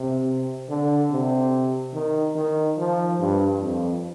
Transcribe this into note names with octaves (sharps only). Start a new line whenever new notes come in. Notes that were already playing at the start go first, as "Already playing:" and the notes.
Already playing: C3
D3
C3
D#3
D#3
F3
G2
F2